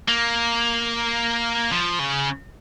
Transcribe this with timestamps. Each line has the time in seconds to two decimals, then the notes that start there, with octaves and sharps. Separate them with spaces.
0.08 A#3
1.72 F3
1.99 C#3